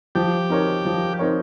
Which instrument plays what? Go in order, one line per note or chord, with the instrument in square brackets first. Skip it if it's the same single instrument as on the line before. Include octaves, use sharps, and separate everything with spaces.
[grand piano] F3 [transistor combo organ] G4
[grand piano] C4 D#4 A#4 C#5
F3
C4 D#4 A#4 C#5